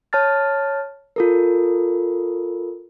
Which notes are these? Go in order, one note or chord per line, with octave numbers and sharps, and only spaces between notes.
C#5 A5 F6 A6
F4 A4 A#4